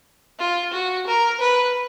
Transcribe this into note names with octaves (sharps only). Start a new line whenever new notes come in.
F4
F#4
A#4
B4